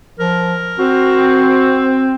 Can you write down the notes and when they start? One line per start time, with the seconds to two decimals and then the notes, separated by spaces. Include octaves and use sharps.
0.19 F3 A#4
0.79 C4 F#4